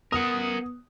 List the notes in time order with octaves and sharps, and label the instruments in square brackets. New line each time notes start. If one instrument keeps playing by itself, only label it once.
[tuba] B3 [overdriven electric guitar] A#4 F#5 [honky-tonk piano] D#6